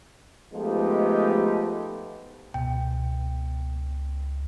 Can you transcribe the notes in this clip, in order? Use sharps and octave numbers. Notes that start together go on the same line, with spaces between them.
F3 G#3 A3 B3 D#4 G4
C#2 B2 G5